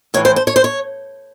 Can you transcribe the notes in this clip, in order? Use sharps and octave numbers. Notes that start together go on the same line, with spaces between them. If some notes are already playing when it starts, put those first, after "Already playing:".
A2 E3 C#5
C5
C5
C#5
C5
C#5